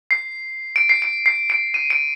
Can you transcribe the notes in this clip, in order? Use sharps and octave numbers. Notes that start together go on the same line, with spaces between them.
C7
D7
C7
D7
C7
D7
D#7
D7